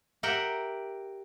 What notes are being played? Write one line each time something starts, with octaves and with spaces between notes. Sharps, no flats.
G4 A#4 E5 F#5 G5